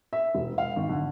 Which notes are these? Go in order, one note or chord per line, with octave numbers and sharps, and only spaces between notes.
E5
E1
F5
G#1
D3